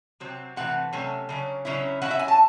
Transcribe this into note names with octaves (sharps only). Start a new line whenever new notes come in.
C3 F#3 C4
C3 E3 A3 C4 F#5
C3 F#3 A3 C#4
C#3 F#3 C#4
C#3 F#3 C#4 E4
F#3 C#4 E4 F#5
E5
G#5
A5